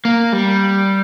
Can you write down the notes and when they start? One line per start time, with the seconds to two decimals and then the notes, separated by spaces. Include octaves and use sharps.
0.05 A#3
0.33 G3